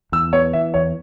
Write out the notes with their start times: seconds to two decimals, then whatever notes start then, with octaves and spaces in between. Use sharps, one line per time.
0.12 E2 E6
0.33 B3 C#5
0.53 E3 E5
0.74 E2 C#5